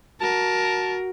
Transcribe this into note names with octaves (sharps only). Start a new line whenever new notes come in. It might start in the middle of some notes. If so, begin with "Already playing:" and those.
F#4 A#4 A5